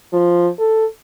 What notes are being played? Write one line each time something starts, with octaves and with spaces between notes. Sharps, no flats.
F3
A4